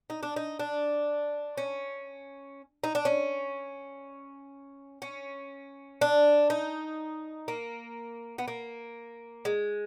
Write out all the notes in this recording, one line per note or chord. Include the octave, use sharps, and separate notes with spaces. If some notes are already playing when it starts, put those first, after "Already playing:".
D#4
D4
D#4
D4
C#4
D#4
D4
C#4
C#4
D4
D#4
A#3
B3
A#3
G#3